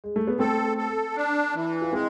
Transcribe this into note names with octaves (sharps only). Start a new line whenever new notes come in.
G#3
A3
B3
A3 C4 A4
A4
D4
E3
F4
G#3 C4 E4